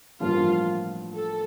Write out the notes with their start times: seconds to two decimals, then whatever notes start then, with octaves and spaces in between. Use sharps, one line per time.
0.20 A1 G2 F3 A#3 F4
1.15 A4